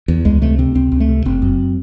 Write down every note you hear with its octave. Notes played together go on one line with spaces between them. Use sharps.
E2
C#2 G#3
C3 A3
C3 C4
C#2 C4
C#2
A3
C3
F#1 C4
F#2